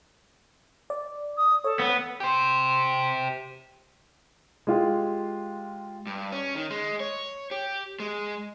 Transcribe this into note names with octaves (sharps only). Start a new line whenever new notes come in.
D5
D#6
A4 C#5
B3
G4 C5
G#3 F4 G4
G2
C#4
D#3
G#3
C#5
G4
G#3